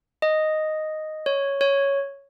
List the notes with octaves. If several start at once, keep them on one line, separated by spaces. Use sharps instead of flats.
D#5
C#5
C#5